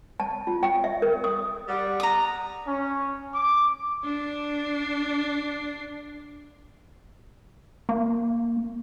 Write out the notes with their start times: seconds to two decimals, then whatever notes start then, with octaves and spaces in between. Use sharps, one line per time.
0.20 A5
0.47 F4
0.63 G5
0.84 E5
1.02 A#4
1.24 D#6
1.68 G3 F#5
2.00 A#5 D#6
2.65 C#4
3.35 D6
4.04 D4 C7
7.89 A#3